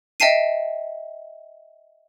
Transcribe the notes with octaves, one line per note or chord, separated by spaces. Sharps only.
D#5 E5 G5 A5 C7 D#7